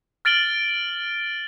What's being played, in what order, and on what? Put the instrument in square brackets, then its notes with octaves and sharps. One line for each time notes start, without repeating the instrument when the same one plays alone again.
[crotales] F6 A6 D7 F#7 G7